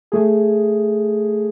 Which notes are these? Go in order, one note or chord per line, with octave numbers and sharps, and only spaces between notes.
A3 G#4